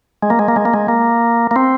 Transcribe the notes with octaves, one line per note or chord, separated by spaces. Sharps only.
G#3
A#3
G#3
A#3
G#3
A#3
G#3
A#3
A#3
C4